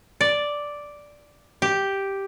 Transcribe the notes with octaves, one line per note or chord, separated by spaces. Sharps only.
D5
G4